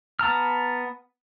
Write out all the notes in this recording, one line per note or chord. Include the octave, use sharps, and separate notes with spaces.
B3 A5 A#5 F6